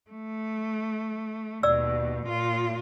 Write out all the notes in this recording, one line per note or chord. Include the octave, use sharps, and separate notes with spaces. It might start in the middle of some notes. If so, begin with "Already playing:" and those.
A3
D#2 B2 D5 E6
A#2 F4